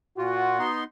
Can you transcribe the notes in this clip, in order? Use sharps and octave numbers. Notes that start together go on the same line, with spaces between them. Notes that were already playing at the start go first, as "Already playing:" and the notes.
A#2 F4 F#4
B3 D#4 C6